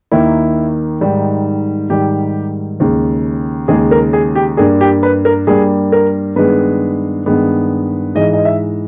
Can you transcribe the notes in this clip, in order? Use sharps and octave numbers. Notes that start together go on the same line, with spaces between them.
D#2 D#3 A#3 E4
G#2 D#3 G3
G#2 D#3 G3 G4
D#2 C#3 G#3
D#2 C#3 G#3 G#4
A#4
G#4
G4
G2 G3 A#3 G#4
G4
B4
A#4
G2 G3 A#3 G#4
A#4
G2 D#3 G#3 B3 B4
G2 D#3 G#3 B3
G#2 E3 G#3 D#5
D#5
E5